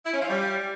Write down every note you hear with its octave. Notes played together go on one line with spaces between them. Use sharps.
E4
C#4
F4
G3